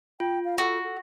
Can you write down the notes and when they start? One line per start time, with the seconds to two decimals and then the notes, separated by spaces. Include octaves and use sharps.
0.20 F4 G5
0.45 F5
0.58 F#4 A4
0.84 A4